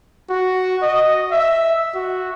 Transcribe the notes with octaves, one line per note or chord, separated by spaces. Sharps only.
F#4
D#5
E5
F#4